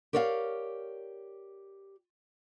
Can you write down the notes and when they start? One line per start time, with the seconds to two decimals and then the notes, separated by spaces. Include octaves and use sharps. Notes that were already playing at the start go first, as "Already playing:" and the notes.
0.13 G4 A#4 C#5 D5 E5 F5